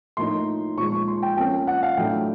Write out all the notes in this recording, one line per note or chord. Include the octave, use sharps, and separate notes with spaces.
A2 F3 A#3 D#4 C6
A#2 F3 G#3 C#6
C#6
C6
G5
F3 A#3 C#4 G5
F#5
F5
A2 F#3 A3 D4 G5